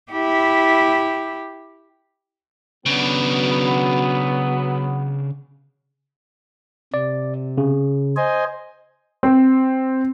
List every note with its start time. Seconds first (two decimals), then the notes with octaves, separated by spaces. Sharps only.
0.12 E4 G4
2.86 C#3 F#3 B3 D4
6.94 C3 D5
7.58 C#3
8.16 C5 D#5 G#5
9.23 C4